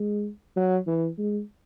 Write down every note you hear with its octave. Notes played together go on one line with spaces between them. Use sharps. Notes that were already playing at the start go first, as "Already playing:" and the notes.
Already playing: G#3
F#3
E3
G#3